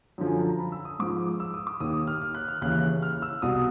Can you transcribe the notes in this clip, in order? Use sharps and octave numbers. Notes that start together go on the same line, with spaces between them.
F#2 D3 F3
G#5
A5
A#5
B5
E6
D#6
G#2 F3 D6
E6
D#6
D6
D#2 D#3 D#6
F6
F6
F#6
F6
D#2 C#3 E3 F#6
F6
E6
C2 B2 D#6